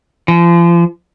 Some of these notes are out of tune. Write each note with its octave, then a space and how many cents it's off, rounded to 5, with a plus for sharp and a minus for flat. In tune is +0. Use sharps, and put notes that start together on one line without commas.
F3 -35